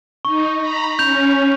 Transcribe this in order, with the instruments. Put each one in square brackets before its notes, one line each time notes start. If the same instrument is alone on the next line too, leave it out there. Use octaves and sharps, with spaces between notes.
[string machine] D#4 [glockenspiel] C#6
[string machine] A#5 B5
[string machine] C#4 [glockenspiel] G6 F7